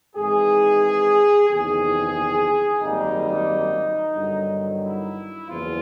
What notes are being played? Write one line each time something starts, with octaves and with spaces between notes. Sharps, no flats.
G#1 G#2 E3 G#3 G#4
F#1 E2 C3 D#3 G#4
G#1 F#2 D#3 G3 A#3 D#4
G1 G2 D#3 F#3
E4
F#1 E2 C#3 F3 F4